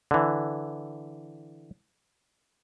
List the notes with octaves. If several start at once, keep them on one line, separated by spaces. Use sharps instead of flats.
D3 E3